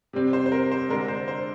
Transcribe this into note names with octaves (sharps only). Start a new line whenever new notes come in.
C3 G3 C4
C5
C5
A#4
C5
D3 G#3 D4 A#4
C5
C5